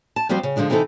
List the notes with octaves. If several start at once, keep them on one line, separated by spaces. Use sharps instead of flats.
A5
F3 G3 C4 F#4 G4 C5
C#3
D3 F3 F#3 G#3 D4
C3 E3 C4 D#4 A4